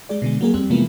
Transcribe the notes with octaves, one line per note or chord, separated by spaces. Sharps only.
G#3 G#4 D5
B2 D3 G#3
F#3 A#3 G#4
F2 G3 C4
C3 E3 F3 G#3 A#3 B3